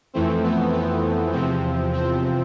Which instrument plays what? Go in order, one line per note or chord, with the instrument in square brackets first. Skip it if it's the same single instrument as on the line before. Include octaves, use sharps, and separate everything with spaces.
[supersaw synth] F2 E3 A3 C4
B3
B3
E2 C3 F3 C4
C4